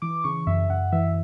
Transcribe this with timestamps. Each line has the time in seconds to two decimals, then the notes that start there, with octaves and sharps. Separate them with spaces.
0.02 E3 D6
0.24 C#3 C#6
0.47 F#2 E5
0.70 F#2 F#5
0.92 E3 E5